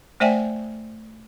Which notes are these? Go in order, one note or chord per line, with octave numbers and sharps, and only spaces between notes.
A3 C5 D5 E5 G5 G#5